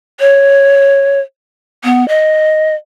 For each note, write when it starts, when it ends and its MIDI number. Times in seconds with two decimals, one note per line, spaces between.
0.20 1.20 73
1.84 2.07 59
2.08 2.74 75